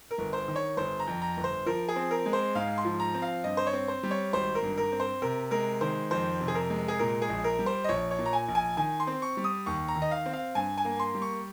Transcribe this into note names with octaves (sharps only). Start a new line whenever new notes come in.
A#4
G1
C5
D#3
C#5
G1 C5
A#5
F2
A#5
G1
C5
F3 A#4
G#4
C4
A#4
G#3
C5
G#2 F5
C6
F3
A#5
C4
F5
G2 D#5
C5
C#5
C4
C5
G3
C#5
G#1 C5
A#4
G2
A#4
C4
C5
C3 A#4
G#3 A#4
D#3 C5
F2 C5
C3
G#4
A#4
G#3
G#4
A#2 A#4
G#4
A#1
A#4
G3
C5
D#5
A#1 C#5
C#5
A#2
A#5
G#5
A#1
G#5
D#3 G#5
C6
C4
C#6
G3
D#6
D#2 C#6
A#5
D#3
D#5
F5
C4
F5
G2 G#5
G#5
A#3
C6
G3
C#6